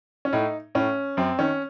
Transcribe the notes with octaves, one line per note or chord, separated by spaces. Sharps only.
C#4
A2 D#4
A2 C#4
F#2 C4
D#3 C#4